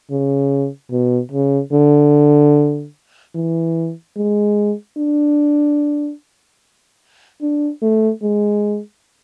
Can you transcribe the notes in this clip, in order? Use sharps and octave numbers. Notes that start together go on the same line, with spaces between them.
C#3
B2
C#3
D3
E3
G#3
D4
D4
A3
G#3